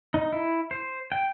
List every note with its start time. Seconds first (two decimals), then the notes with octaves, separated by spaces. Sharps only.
0.14 D#4
0.33 E4
0.71 C5
1.12 G5